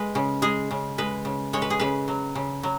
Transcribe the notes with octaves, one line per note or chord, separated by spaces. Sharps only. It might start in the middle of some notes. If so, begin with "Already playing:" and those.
Already playing: G#3 B4
C#3
G#3 G#4
C#3
G#3 B4
C#3
G#3 C#5
B4
G#4
C#3 B4
F#3
C#3
F#3